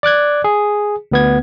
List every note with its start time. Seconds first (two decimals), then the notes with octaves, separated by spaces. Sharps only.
0.03 D5 D6 F#6 G#6
0.44 G#4
1.11 D2 B3 G#6